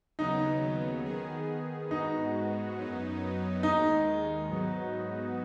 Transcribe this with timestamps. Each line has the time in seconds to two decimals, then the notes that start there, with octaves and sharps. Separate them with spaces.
0.19 D#2 C#3 F#3 B3 D#4
1.05 D#3 B3 G#4
1.91 G#2 G#3 B3 D#4 F#4
2.77 F#2 F#3 B3 D#4
3.63 D#2 D#3 G#3 D#4
4.49 G#2 F#3 B3 D#4 F#4